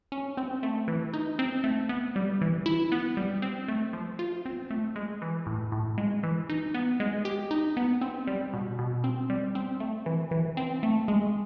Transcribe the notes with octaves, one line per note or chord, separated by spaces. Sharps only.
C#4
C4
A3
E3
D#4
C4
A3
B3
G3
E3
E4
B3
G3
C4
A3
F3
F4
C4
A3
G#3
E3
A2
A2
G#3
E3
D#4
B3
G#3
G4
D#4
B3
C4
G3
B2
B2
C4
G3
C4
A3
E3
E3
C4
A3
G#3